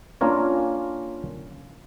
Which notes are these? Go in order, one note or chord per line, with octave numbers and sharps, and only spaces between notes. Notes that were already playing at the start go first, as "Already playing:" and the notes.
A#3 C#4 D4 F4 A#4 C#5